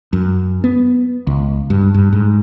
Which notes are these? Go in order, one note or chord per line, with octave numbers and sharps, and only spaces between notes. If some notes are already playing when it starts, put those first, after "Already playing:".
F#2
B3
C#2
G2
G2
G#2